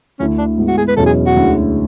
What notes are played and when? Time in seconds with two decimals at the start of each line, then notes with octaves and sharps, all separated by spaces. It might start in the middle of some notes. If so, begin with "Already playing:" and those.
0.19 D2 D3 A3 C#4 E4
0.38 D4
0.58 G#2 G#3 B3 E4
0.67 F#4
0.77 G#4
0.88 B4
0.97 E2 B2 F#3 C#4 E4 A4
1.06 G#4
1.26 F#4
1.36 D2 D3 G#3 C#4 E4